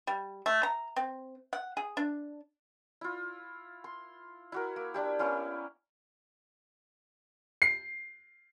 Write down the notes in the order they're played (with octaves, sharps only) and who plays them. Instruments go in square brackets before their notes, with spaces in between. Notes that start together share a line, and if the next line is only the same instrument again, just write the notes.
[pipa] G3
A3
A#5
C4
F#5
G#4
D4
[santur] E4 F4
C6
E4 F#4 A#4
A#3
D4 E4 G4
A#3 B3 C#4 E4
[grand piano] C7